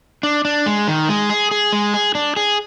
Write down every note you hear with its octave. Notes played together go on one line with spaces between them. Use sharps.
D4
D4
G#3
D#3
G#3
G#4
G#4
G#3
G#4
D4
G#4